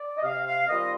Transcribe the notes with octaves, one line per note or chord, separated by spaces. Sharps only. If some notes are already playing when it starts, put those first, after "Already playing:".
Already playing: D5
D#5
C3 F5
F5
D#3 G3 C4 F4 D#5